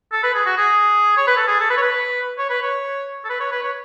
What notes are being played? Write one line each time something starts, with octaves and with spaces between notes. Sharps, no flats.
A4
B4
G#4
F#4
G#4
C#5
B4
A4
G#4
A4
B4
C#5
B4
C#5
B4
C#5
A4
B4
C#5
B4
C#5